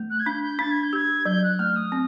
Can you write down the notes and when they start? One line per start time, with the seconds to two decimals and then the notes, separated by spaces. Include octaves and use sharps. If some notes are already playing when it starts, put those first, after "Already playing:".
Already playing: A3
0.10 F#6
0.19 G#6
0.26 D4 G6
0.43 G6
0.59 D4 A6
0.70 G#6
0.83 G6
0.93 G4 G#6
1.26 F#3 G6
1.43 F#6
1.59 A3 F6
1.75 D#6
1.92 C4